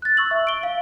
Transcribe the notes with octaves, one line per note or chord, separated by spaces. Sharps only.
F#6 A6
C#6 E6 F#7
E5
D7 G7
F5